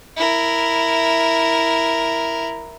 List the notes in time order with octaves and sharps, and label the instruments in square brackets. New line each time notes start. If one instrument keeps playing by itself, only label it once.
[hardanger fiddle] E4 A#4